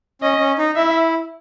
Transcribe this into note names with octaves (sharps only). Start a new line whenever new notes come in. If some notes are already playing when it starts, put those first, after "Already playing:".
C#4 D#5
C#4
D#4
E4 E5